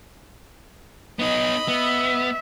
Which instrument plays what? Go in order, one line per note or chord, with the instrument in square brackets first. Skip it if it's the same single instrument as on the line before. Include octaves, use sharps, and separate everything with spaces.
[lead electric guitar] B3 D#4 [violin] D#5 B5
[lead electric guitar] B3 [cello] E5